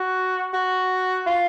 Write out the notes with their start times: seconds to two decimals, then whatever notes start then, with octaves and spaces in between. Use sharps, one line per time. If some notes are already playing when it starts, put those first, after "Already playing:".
Already playing: F#4
0.54 F#4
1.26 F4